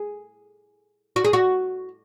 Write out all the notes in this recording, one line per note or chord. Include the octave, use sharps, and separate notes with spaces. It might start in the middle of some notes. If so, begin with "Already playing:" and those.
Already playing: G#4
F#4
G#4
F#4